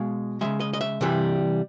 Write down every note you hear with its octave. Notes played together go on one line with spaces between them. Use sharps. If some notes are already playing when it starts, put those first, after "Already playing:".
Already playing: B2 G#3 F5
C#3 F3 G#3 E5
D#5
D#5
E5
C3 E3 G3